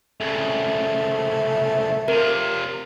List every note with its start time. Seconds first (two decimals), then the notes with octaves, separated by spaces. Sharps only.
0.20 C2 C#3 A3
2.08 C3 F4 A#4